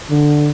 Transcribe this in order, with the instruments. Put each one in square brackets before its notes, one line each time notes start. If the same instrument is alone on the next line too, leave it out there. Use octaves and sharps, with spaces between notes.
[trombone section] D3